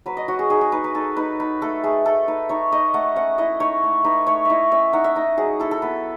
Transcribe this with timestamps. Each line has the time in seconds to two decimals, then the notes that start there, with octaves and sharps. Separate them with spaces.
0.06 F#3 B4
0.17 D#5
0.28 F#3 F#4
0.39 G#4
0.50 D#4 G#4
0.61 G#4
0.72 D#4 B4
0.84 B4
0.95 D#4 A4
1.17 D#4 B4
1.39 D#4 B4
1.61 A3 A4
1.84 A3 G#4
2.05 A3 A4
2.28 D#4 B4
2.49 D#4 C#5
2.71 D#4 D#5
2.94 A3 F#5
3.16 C#4 F#5
3.38 E4 D#5
3.60 D#4 C#5
3.83 A3
4.04 D#4 B4
4.27 A3 C#5
4.45 E4 D#5 E5
4.72 C#4 E5
4.93 D#4 F#5
5.04 E5
5.15 D#4 D#5
5.38 F#3 G#4
5.60 E4 A4
5.71 A4
5.82 B3 B4